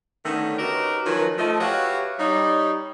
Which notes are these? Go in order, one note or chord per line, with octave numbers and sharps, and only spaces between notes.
D3 D#3 A3 B3 C#4
D#4 F#4 G4 A#4 B4 C#5
D#3 F3 F#3 C#4 B4
F3 A3 D#5
F#4 G4 B4 C#5 E5 F5
G3 D#4 C#5